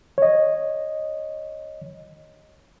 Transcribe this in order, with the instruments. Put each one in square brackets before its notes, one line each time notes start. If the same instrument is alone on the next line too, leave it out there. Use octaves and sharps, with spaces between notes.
[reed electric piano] C#5 D#5